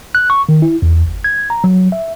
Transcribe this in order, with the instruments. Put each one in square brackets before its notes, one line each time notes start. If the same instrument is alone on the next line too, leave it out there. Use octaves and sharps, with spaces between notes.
[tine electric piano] F#6
C#6
D#3
E4
E2
G1
G#6
A#5
F#3
E5